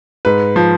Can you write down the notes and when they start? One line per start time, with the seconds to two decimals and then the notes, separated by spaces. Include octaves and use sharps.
0.25 G#2 B4
0.56 F3